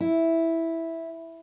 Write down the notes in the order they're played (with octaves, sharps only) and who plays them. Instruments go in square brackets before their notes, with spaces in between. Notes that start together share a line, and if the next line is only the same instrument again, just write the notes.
[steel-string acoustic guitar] E4